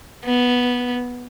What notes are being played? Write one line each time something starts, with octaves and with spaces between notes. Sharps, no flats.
B3